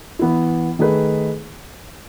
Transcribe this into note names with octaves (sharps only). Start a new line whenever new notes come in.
E3 B3 E4
D#3 A3 D#4 G#4 B4